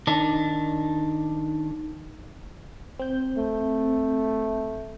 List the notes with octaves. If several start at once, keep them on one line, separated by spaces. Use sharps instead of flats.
D#3 D4
C4 G6
A3